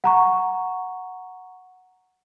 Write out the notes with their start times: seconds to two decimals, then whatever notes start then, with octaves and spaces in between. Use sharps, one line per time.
0.04 F#5 A#5 C#6